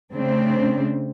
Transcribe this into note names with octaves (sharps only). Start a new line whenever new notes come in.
C#3 A3 C4 D4